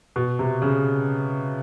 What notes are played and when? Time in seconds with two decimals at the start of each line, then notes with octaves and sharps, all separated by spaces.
0.16 B2
0.39 C3
0.62 C#3